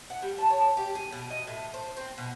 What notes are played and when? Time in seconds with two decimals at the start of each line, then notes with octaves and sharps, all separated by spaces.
0.10 F#5
0.22 G3
0.38 A5
0.50 C#5
0.77 G4
0.95 G#4
1.12 B2
1.30 D#5
1.47 A2
1.74 C5
1.97 C4
2.18 B2